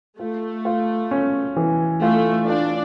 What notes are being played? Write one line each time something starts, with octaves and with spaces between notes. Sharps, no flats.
A3 F4
F4
C#4
E3
A3 F4
D4 F4